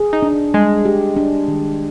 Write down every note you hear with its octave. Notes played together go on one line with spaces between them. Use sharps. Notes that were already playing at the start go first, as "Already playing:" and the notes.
Already playing: G#4
D#4
D4
G3 G#3
G4
D4
D#3